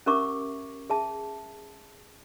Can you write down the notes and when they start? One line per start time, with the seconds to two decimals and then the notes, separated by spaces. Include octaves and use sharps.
0.06 C#4 G4 A#4 E5 C#6 D6
0.90 G#4 E5 A5